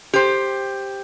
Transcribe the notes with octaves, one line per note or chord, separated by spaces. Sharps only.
G4 C5